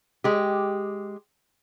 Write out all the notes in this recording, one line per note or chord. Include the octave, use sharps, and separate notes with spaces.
G#3 G4